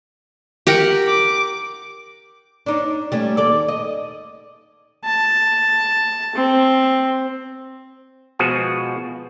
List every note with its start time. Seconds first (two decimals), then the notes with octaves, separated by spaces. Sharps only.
0.67 G4 A#4 F#5
1.08 D6
2.66 D4 D#4 C#5
3.12 G3 A3 C#4
3.37 D#2 A4 D5
3.68 D#5
5.05 A5
6.35 C4
8.39 B2 F3 G#3 F#4 G#4